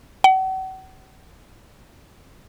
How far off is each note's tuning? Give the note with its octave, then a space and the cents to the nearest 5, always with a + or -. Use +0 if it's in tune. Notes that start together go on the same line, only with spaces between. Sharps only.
F#5 +40